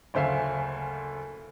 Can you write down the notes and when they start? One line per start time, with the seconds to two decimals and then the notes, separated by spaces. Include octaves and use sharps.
0.14 F#1 D2 C5 E5 F5 G#5